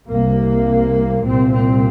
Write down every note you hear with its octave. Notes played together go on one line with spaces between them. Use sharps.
C2 C3 A#3
C2 A#2 C4
C4